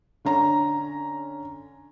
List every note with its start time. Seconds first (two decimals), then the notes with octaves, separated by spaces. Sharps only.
0.25 D3 C#4 A#5